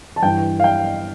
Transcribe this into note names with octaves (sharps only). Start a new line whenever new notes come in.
A5
G2 E3 G5
F5
G5